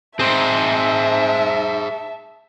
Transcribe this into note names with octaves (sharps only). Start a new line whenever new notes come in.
C4 D#4 G#4 C5 E5 A5